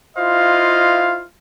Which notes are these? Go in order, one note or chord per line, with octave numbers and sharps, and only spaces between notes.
E4 F4 C5 D#5 F5